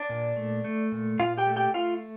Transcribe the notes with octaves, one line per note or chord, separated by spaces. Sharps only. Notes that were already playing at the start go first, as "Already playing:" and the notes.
Already playing: D4 D5
A#2
A3
A3
A#2
A#2 F4 F5
G4 G5
A3
G4 G5
A3 F4 F5